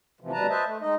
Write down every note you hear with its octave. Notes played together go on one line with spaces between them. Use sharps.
D2 C3 E3 F3
D2 B2 G3 B4 A5 A#5
B4 C5 D#5 E5 A5
A3
G#3 D#4 D#5